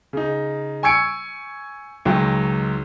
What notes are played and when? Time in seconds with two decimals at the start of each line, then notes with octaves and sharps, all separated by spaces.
0.13 C#3 D#4
0.83 G#5 C#6 E6 G#6 C#7 D7
2.05 C#2 D#3 F#3 G5